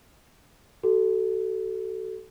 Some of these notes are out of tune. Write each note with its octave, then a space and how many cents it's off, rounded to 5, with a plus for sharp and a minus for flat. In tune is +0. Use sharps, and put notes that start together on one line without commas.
F#4 +35 A4 +0